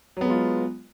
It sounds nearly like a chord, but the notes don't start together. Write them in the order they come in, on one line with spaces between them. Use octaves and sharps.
F#3 B3 G#3 F4